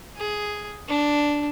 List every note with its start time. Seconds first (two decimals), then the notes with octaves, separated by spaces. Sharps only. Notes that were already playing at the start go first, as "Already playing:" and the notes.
0.17 G#4
0.88 D4